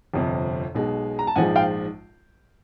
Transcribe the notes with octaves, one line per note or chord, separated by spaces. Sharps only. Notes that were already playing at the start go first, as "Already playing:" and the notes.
G1 F2 C3
B1 B2 G#3
A#5
A5
A#1 G#2 F3 G#3 F#5 G#5
F5 G5